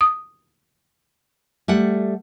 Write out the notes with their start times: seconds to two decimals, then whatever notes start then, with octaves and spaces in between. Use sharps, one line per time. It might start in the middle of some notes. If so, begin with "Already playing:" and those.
0.01 D#6
1.68 G3 A3 F#5